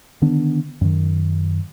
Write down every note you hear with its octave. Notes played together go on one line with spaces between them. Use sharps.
D3 D#3 B3 D4
F#2 D#3